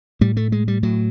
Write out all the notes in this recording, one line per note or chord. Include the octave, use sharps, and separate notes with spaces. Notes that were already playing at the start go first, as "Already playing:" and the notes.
A2 G3
A3
G#3
G3
A2 F#3